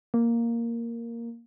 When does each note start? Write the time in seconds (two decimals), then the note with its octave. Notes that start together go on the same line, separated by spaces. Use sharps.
0.14 A#3